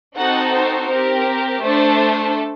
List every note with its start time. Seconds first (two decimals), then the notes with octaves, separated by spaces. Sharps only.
0.16 C4 D#4 F#4 A4 F#5
0.53 C5
0.90 C4 G4 A#4
1.63 A3 D4 A4 C5